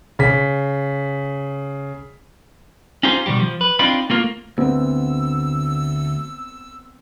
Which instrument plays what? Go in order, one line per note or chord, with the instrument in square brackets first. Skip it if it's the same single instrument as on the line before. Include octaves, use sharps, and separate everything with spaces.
[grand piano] C#3 B6
[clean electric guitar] C#4 D#4 F4 G4 G#4 C5
B2 D#3 G3 G4
F3
B4
C4 D4 D#4 F4 G5 B5
A3 A#3 F4 A#4
[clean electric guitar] D2 [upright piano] B3 C4 [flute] E6